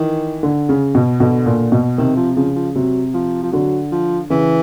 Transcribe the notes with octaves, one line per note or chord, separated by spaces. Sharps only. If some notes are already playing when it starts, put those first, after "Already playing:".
Already playing: D#3 E3
D3
C#3
B2
B2 D3
A#2
B2
C3 D#3
F3
C#3 F3
F3
C3 F#3
F3
F3
D3 F#3
F3
C#3 E3